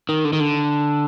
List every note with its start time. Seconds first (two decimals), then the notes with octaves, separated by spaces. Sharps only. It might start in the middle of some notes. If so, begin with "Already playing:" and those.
0.09 D#3
0.25 D3
0.33 D#3
0.40 D3